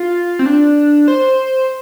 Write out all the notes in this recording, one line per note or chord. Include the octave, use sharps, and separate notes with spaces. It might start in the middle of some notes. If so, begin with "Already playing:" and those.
Already playing: F4
C4
D4
C5